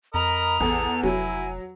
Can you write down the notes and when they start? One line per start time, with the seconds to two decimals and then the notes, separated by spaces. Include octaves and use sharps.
0.14 F2 A#4 D#5 A#5 B5
0.60 A1 E2 G#4 A4
1.04 F1 F#3 E4 G#5